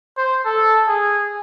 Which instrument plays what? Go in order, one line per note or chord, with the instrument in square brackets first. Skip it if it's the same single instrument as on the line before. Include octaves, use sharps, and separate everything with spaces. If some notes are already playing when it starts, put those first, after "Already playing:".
[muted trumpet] C5
A4
G#4